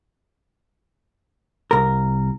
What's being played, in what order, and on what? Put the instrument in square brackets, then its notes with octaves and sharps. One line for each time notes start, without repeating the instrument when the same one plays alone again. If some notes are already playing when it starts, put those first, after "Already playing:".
[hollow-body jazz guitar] C2 A#4